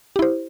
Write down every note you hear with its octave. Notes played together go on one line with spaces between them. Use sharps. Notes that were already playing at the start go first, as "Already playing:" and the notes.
E4 G4 C5